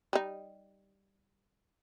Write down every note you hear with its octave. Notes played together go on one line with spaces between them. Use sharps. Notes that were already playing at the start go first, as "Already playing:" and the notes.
G3 D#4